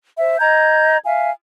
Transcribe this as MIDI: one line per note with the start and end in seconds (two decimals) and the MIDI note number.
0.17 0.36 72
0.17 0.36 76
0.40 0.97 75
0.40 0.97 82
0.40 0.97 91
0.40 0.97 92
1.05 1.30 76
1.05 1.30 77
1.05 1.30 80